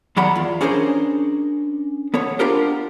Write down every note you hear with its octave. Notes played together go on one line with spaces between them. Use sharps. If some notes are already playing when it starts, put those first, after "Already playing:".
E2 D#3 F#3 D5 F#5 B5
E2 F4
C#4 D4 G#4 A#4 C5 C#5
B3 A4 C#5
B3 D4 F4 G4 A#4 C5